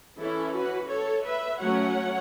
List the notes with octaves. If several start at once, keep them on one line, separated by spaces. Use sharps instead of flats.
E3 C#4 E4 A4
F#4 B4
A4 C#5
B4 E5
F#3 A3 C#4 C#5 F#5